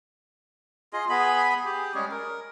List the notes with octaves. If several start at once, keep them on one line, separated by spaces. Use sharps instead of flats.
F4 G#4 D#5
B3 G#4 B5
G4 G#4
G3 G#3 C#4 G#4
A#4